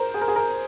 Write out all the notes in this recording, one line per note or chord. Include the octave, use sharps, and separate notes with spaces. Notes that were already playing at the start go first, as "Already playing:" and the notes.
Already playing: A#4 C5
G#4
A#4
G#4
A#4